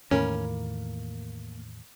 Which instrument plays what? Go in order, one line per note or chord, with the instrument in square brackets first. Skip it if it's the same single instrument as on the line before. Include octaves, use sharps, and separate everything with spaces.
[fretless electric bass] E2 A2 D#3 [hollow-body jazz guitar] A#3 A#4 B5 [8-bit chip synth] C#4